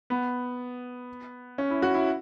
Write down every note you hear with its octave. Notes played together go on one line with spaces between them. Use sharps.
B3
C#4
E4
F#4
E4